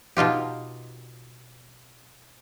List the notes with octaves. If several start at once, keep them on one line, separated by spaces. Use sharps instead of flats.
B2 D#4 F4 G4